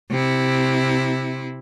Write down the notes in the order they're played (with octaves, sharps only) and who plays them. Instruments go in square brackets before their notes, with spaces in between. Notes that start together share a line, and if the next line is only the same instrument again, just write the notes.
[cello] C3 E4